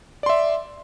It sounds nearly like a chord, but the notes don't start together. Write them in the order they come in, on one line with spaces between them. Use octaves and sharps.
D5 C6 E5